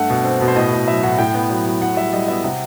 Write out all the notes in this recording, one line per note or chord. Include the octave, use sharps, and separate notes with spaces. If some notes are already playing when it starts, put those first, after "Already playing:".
Already playing: G2 A3 F#5
B2
C4
B2
C5
A2 D#5
A2
F#3 E5
A2 F#5
A2 G5
B3 F#5
F#3
F#3
A2 F#5
G3 E5
G3 D#5
B3 E5
C3 F#5